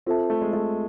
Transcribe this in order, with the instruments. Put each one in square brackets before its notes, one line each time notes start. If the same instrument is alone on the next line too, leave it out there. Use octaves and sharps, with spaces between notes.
[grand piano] C4 [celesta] F4 A4 C5 E5 A5
[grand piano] A3
G#3
A3